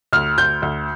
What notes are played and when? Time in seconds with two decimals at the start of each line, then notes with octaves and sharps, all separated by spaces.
0.13 D2 F6
0.38 D2 G6
0.62 D2